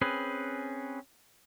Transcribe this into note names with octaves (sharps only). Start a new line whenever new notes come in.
C4 C#4 G#4 B4